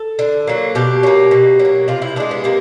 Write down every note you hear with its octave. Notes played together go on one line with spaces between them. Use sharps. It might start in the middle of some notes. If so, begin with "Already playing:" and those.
Already playing: A4
D3
F#3 A#3
B2 G4
F#3 A#3
B2
F#3
A#3
C3 F4
E4
E3 G#3 D4
B3
C3 A#3